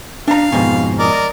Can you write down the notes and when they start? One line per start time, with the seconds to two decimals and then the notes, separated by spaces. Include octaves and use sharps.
0.28 D4 F5 A#5
0.52 F2 G#2 B2
0.99 A#4 D5 D#5